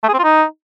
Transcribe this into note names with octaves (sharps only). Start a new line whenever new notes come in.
A3
G#4
C4
F4
D#4